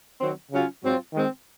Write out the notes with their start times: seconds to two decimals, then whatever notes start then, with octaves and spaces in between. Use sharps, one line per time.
0.21 D#3 F#3 C4
0.51 C#3 F#3 C#4 F4
0.82 G#2 F#3 C4 F4
1.14 D#3 G#3 C4